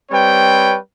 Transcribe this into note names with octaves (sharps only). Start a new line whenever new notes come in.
G3 C4 B4 C#5 G5